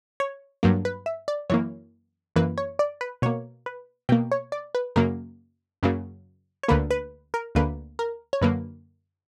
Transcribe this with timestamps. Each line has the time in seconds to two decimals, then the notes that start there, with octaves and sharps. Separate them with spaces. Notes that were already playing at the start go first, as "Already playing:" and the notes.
0.20 C#5
0.63 G2 F#3 A#3
0.85 B4
1.06 E5
1.28 D5
1.50 F#2 E3 A#3 C#5
2.36 F#2 E3 A#3 B4
2.58 C#5
2.79 D5
3.01 B4
3.22 B2 A#3 C#5
3.66 B4
4.09 B2 G5
4.12 A#3
4.32 C#5
4.52 D5
4.75 B4
4.96 F#2 C#3 F#3 A#3 A#4
5.83 F#2 C#3 F#3 A#3
6.63 C#5
6.68 D2 D3 A#3 B4
6.91 B4
7.34 A#4
7.55 D2 D3 A#3 B4
7.99 A#4
8.33 C#5
8.42 F#2 D3 F#3 A#3 B4